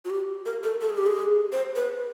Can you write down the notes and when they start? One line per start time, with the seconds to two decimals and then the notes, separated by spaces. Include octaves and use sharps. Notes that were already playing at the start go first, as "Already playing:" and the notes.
0.05 F#4
0.10 G4
0.46 A#4
0.63 A4
0.81 A4
0.90 G#4
0.98 G4
1.06 G#4
1.52 C5
1.76 B4